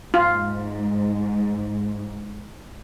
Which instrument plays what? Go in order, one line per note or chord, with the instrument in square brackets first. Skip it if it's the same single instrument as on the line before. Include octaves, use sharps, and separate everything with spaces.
[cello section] G#2 [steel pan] F4